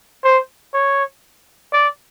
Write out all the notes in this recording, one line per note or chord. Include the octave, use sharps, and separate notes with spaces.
C5
C#5
D5